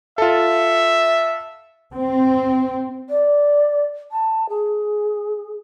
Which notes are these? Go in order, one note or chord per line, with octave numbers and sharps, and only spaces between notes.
F4 A4 E5
C4
D5
A5
G#4